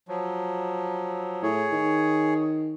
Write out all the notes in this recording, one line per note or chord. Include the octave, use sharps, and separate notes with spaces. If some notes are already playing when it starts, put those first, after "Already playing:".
F3 F#3
A2 G#4 C#5
D#3